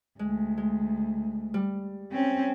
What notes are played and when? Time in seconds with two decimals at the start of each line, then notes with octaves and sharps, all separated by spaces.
0.19 D2 G#3
0.57 G#3
1.54 G3
2.12 C4 C#4